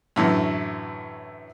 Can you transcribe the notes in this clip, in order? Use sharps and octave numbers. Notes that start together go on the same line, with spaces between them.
F#2 A2 D3 E3